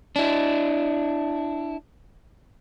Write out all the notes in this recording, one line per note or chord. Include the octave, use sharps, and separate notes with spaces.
D4 E4